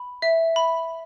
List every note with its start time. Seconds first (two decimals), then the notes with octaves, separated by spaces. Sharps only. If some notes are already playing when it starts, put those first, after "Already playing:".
Already playing: B5
0.22 E5
0.56 B5